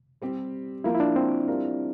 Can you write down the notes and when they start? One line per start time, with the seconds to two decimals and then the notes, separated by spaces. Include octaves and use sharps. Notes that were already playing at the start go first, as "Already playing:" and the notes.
0.22 G3 C4 G4
0.84 F3 A#3 E4 F4 A#4
0.94 E4
1.00 D4
1.16 C4
1.48 G3 D4 F4 A#4